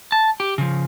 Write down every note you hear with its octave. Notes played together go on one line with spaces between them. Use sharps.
A5
G4
C#3 F3